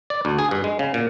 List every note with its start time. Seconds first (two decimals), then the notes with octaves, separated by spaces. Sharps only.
0.10 D5
0.25 D2
0.38 G#4
0.51 G2
0.64 G#3
0.79 C#3
0.94 A#2